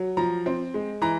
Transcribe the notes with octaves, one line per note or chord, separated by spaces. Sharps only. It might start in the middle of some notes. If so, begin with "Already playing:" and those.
Already playing: F#3
F3 A#5
C4
G#3
E3 A#5